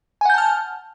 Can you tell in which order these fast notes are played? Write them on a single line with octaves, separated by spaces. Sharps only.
G#5 F#5 G6 A5 F6